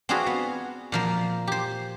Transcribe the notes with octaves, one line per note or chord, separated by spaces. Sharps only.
C4 D4 F4 F#4 G#4 B4
B3
A#2 F3 A#3
G4 C5